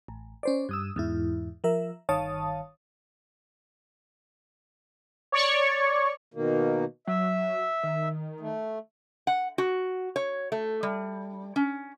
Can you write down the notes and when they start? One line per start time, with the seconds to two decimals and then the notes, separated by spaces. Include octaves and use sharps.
0.08 A1
0.43 C#4 C5 D5
0.69 G2 D#6 E6
0.96 E2 G#2 E4
1.64 F3 A#4 E5
2.09 G1 D#3 C#5 F5 A5 D#6
5.32 C#5 D5 C#6
6.34 B2 D#3 A#3
7.07 F#3 E5
7.83 D#3
8.40 A3
9.27 F#5
9.58 F#4
10.16 C#5
10.52 A3
10.83 G3
11.56 C#4